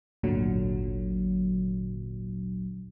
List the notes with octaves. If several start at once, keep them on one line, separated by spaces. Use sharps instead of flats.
G#1 D2 A#2 D3 F#3